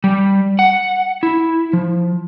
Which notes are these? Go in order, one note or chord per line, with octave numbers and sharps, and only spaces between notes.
G3
F#5
E4
F3